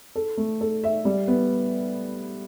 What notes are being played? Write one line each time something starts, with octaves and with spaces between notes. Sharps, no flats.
A4
A3
A4
E5
G3
B3